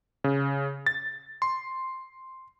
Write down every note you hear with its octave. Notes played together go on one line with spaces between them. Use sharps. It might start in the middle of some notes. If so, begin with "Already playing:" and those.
C#3
A6
C6